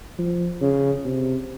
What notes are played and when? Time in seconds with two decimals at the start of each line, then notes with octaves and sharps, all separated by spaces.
0.18 F3
0.61 C#3
1.05 C3